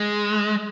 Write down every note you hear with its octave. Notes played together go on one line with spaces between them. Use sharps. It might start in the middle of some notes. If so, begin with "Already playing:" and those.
Already playing: G#3